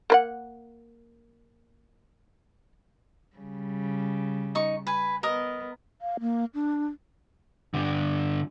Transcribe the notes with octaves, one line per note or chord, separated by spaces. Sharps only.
A#3 B4 F#5
C#3 G3
D#4 C#6
B4 G#5
B3 A#4 D#5
F5
A#3
D4
G2 D3